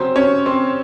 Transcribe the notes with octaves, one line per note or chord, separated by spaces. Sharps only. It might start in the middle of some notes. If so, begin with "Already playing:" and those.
Already playing: C#3 F#3 C4 C#4 C5
C#4 C#5
C4 C5